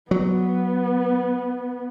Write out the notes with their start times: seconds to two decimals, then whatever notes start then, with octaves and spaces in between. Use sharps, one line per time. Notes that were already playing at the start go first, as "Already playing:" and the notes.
0.11 F#3 B3